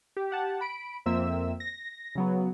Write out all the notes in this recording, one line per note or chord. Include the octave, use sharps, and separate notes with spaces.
G4
G4 F#5 A5
B5 D7
F2 A#3 C4 E5 E6
A#6
C#3 F#3 B3